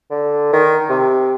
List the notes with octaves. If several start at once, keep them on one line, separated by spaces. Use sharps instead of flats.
D3
D#3
C3